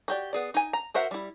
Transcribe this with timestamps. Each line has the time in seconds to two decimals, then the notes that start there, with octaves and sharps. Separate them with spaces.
0.08 F#4 G4 D5
0.33 B3 G#4 D5
0.54 D#4 G#5
0.73 A#5
0.94 F#4 A#4 C5 E5 F#5
1.11 G3 E4